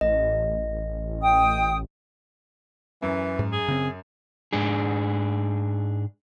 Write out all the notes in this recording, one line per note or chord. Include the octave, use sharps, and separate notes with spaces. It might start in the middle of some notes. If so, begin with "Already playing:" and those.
A1 D#5
G5 D#6
F#2 E3
G#2
G#4
C#3 C4
G#2 D4 G#4